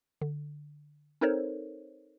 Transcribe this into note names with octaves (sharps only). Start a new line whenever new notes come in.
D3
C4 D#4 A4 A#4 C5 C#5